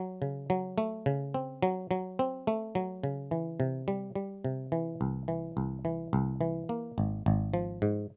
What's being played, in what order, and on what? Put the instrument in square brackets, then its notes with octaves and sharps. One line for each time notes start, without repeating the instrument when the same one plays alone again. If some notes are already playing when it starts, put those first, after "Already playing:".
Already playing: [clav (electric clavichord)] F#3
C#3
F#3
A3
C#3
C4
F#3
F#3
C4
A3
F#3
C#3
E3
C3
G3
G3
C3
E3
C2
E3
C2
E3
C2
E3
A#3
G#1
G#1
F3
G#2